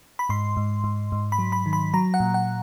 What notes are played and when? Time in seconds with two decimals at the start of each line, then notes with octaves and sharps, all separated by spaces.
0.19 B5
0.29 G#2 C6
0.57 G#2
0.84 G#2
1.12 G#2
1.32 B5
1.39 F#3
1.52 B5
1.66 D#3
1.73 B5
1.94 F#3 A#5
2.14 F#5
2.20 A#2
2.34 F#5